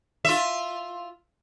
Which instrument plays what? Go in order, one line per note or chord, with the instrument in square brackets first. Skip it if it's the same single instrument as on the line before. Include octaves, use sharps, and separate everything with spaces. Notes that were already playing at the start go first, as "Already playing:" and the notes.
[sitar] F4 E5